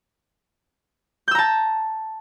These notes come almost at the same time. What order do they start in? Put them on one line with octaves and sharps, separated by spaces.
G6 E6 A#5 A5